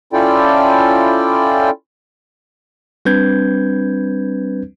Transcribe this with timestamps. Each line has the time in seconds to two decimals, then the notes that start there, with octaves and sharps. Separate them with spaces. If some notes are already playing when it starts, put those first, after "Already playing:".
0.13 C#4 E4 F4 A4 D5 G5
3.05 G3 C4 D4 B4 G6 G#6